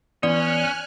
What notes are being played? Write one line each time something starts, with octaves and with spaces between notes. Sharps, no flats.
E3 B3 C#4 D5 G#5 D#6 F6 F#6